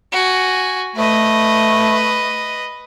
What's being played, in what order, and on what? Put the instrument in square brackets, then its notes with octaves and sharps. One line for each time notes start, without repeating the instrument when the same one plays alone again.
[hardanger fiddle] F#4 G#5
[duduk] A3 [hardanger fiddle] B4 D#5